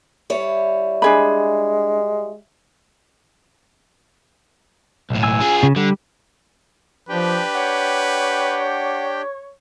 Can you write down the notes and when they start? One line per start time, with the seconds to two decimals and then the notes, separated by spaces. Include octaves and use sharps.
0.30 G3 E4 C#5
1.02 G#3 D4 G#4 B5
5.10 B1 A2
5.23 G#5 E6
5.41 F4 G#4
5.63 C#3
5.76 D3 G3
7.09 F3 D4 G4 B4 G5
7.54 C#5 F#5